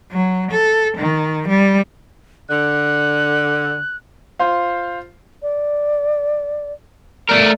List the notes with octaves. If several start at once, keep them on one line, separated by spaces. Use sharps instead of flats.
F#3
A4
D#3
G3
D3 F#6
F4 C5 F5
D5
A3 A#4 D5